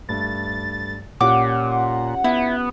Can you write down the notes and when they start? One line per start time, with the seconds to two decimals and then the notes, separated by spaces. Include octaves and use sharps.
0.09 G2 A3 A6
1.21 A#2 C#4 F4 G4 F#5 D6
2.24 B3 E4